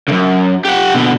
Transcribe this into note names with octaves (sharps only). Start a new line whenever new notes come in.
C#2 F#2
G4 F#5
B2 D3